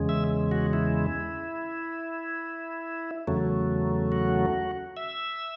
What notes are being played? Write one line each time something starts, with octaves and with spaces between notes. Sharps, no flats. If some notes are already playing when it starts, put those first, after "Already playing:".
Already playing: E2 C#3 G#3
E5
F#4
E4
E2 C#3 F#3 A3
F#4
E5